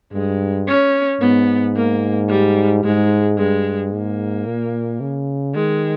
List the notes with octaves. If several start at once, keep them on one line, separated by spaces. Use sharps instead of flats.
G2 G#3
C#4
G#2 B3
A#3
G3
G#2 G#3
G2 G#3
G#2 A#3
A#2
C#3
D#3 G#3